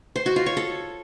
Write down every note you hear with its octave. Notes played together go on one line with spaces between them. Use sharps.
C5
F#4
F4
C#5
A4